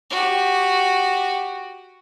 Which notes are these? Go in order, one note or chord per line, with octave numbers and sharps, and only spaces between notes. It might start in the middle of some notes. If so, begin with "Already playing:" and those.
F#4 G4